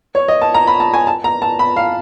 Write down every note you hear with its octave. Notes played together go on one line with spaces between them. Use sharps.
C#5
D#5
A5
A#5
B5
A5
G#5
A5
A#5
A5
B5
F5